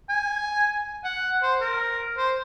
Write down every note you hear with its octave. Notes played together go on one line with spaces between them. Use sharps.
G#5
F#5
C5
A#4
C5